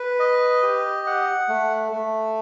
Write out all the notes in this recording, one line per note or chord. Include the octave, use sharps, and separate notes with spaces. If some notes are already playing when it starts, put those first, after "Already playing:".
Already playing: B4
D#5
G4
F#5
A3
A3